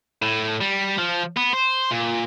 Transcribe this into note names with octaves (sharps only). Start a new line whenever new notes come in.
A2
G3
F3
B3
C5
A#2